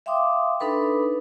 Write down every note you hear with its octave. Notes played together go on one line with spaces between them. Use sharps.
E5 F5 G5 C6 D6 D#6
D4 D#4 A4 B4 B5